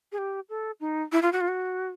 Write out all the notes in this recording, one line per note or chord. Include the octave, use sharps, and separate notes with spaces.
G#4
G4
A4
D#4
E4
F4
F#4
F4
F#4